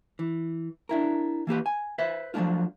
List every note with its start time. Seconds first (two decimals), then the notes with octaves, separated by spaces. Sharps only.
0.19 E3
0.89 D4 E4 A#4
1.47 E3 A#3 G4 B4
1.66 G#5
1.98 B4 C5 E5
2.34 F3 F#3 G#3 A3 D4 F4